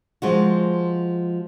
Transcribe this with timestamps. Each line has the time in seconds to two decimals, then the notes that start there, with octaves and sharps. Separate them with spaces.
0.22 F3 G#3 F#4